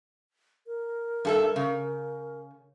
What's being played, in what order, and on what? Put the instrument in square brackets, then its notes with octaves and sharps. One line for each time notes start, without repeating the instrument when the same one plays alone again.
[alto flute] A#4
[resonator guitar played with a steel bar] G2 A4 E5
C#3